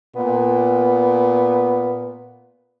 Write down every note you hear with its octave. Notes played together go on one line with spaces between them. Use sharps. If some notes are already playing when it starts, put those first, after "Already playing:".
A#2 B3